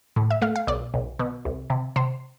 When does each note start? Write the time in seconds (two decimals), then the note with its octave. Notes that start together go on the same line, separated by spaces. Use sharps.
0.16 A2
0.30 E5
0.42 A3 F5
0.56 F5
0.67 B1 D5
0.94 B1
1.19 B2
1.45 C2
1.70 C3
1.96 C3 C5